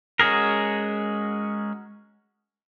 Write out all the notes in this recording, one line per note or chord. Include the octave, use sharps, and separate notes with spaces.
G#3 C#4 F#4 G#4 A#4